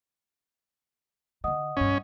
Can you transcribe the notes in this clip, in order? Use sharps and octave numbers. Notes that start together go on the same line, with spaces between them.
D3 D#3 D#5 F#5 D#6
B1 G2 C#4